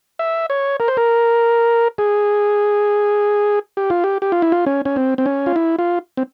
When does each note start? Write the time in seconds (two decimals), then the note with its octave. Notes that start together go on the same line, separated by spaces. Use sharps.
0.19 E5
0.50 C#5
0.80 A#4
0.88 C5
0.97 A#4
1.98 G#4
3.77 G4
3.90 F4
4.04 G4
4.22 G4
4.32 F4
4.42 E4
4.52 F4
4.66 C#4
4.85 C#4
4.96 C4
5.18 C4
5.26 C#4
5.46 F4
5.56 E4
5.79 F4
6.17 C4